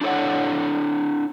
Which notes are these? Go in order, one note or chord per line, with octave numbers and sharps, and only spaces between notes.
D4 E4 A4 C#5 F#5